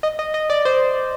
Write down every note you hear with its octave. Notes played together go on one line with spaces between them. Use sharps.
D#5
D#5
D#5
D5
C5